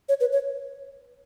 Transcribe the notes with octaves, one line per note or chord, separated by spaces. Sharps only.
C#5
B4
C#5